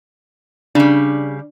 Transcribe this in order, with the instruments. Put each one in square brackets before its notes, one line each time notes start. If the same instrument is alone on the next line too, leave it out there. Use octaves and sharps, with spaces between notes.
[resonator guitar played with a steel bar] C#3 G3 [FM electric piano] D4